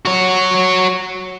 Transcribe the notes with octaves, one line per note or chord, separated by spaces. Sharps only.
F#4 C#5